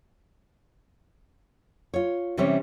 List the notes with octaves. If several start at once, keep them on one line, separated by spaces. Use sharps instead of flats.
F4 C#5
C3 E3 G3 C4 C#4 C#5